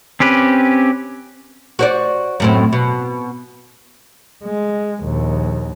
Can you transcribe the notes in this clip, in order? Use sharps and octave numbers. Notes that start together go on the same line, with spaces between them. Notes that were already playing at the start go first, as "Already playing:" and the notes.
C4 C#4 G4 B4
F#4 C5 D5
F#2 A2 C4
B2
G#3
A#1 D#2